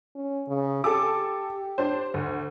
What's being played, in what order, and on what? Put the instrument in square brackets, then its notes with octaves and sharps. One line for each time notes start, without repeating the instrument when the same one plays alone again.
[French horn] C#4
C#3
[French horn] G4 [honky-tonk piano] A4 G#5 D6
[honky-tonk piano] D4 C5
D2